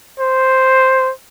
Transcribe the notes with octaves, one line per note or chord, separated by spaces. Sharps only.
C5